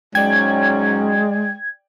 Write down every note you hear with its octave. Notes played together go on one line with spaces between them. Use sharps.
G#2 F#3 G#3 C#4 D5 G5 G#6